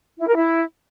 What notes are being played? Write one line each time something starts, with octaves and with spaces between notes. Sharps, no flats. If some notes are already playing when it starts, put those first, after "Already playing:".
E4
A#4
E4